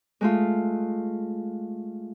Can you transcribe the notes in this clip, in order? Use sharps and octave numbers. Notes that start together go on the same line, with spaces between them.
G#3 A3 F4